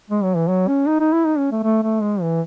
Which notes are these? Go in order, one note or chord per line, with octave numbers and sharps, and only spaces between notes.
G#3
F#3
E3
F#3
C#4
D#4
D#4
E4
D#4
C#4
A3
A3
A3
G#3
E3